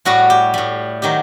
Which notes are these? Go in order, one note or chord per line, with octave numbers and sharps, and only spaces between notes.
A2 G3 F#4
G4
A2 G3
D#3 F#3 G4